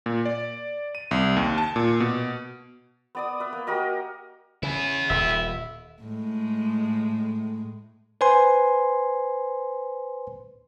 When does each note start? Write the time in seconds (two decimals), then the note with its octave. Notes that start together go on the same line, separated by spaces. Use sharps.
0.06 A#2
0.26 D5
0.95 D#7
1.11 C2
1.36 D#2
1.58 A5
1.76 A#2
2.00 B2
3.15 B3 D5 D#6
3.40 B4 E5
3.53 A#3
3.67 F#4 G4 A#4 D#5
4.63 C#3 B3 E4
5.10 D#1 E5
6.02 A2 G#3
8.21 B4 C5 G#5 C6